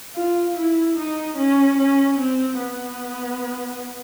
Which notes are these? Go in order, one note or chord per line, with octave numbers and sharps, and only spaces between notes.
F4
E4
D#4
C#4
C#4
C4
B3